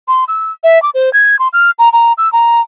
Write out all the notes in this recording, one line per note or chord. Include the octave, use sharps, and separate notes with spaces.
C6
E6
E5
D6
C5
G#6
C6
F6
A#5
A#5
E6
A#5